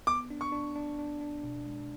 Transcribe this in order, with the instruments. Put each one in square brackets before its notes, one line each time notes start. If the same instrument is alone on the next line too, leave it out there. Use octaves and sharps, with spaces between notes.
[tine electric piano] B3 [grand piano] D6
[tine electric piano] D4
[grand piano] C#6
[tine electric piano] D4
D4
D4
D4
B2
G#3